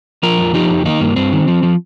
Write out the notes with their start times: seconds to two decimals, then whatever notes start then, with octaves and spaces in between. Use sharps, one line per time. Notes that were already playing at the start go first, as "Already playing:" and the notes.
0.23 F3 F4 A#4
0.38 F2
0.54 F3 D#4 G4
0.70 F2
0.85 D#3 A#3 D#4
1.01 G2 A#3
1.16 G2 C4
1.32 D#3
1.48 F3
1.63 F3